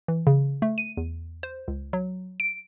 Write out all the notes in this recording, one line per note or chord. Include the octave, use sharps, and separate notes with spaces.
E3
C#3
A3
D#7
E2
C5
C#2
F#3
D7